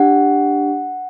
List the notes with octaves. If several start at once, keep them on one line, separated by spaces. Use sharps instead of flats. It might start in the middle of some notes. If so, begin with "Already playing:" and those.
Already playing: D4 G4 F#5